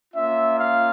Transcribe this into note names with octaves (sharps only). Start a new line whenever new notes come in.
A#3 C#4 F4 E5
F5